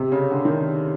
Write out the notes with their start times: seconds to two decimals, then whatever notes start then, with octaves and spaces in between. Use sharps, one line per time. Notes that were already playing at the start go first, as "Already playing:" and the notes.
Already playing: C3
0.12 C#3
0.31 D3
0.45 D#3